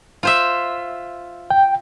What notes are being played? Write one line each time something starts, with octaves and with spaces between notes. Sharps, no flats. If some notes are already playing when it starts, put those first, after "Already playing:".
F4 C5 E5
G5